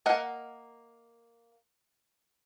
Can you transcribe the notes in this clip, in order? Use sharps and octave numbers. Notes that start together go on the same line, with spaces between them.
A#3 A#4 D#5 F5 F#5